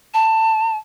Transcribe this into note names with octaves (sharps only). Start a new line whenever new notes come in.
A5